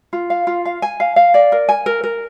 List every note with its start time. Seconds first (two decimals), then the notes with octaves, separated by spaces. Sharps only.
0.13 F4
0.30 F5
0.47 F4
0.65 F5
0.82 G#5
1.00 F5
1.16 F5
1.34 D5
1.52 A#4
1.69 G#5
1.86 A#4
2.04 A#4